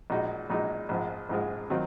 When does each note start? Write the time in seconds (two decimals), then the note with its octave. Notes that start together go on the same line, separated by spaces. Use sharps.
0.10 A#1 A#2 G#3 D#4 F#4
0.50 A#1 A#2 G#3 D#4 F#4
0.89 A#1 G#2 F3 G#3
1.29 A#1 G#2 F3 G#3
1.70 D#3 F#3 C4 F4